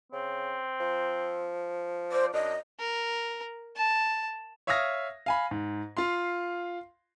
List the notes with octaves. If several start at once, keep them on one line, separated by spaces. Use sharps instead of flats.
C#3 C4
F3
C5 D5
F#2 D4 D#5
A#4
A5
C#5 E5 F5 D#6 F6 A#6
F5 G#5 B5
G#2
F4 F5 C6